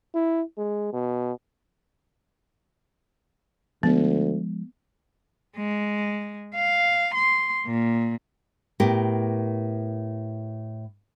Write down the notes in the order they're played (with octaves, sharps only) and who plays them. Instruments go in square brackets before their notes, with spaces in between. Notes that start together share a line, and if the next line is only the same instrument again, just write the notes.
[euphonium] E4
G#3
B2
[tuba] D2 [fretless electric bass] F3 G#3 [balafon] B3
[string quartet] G#3
F5
C6
A#2
[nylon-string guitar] A2 B3 G4 A#4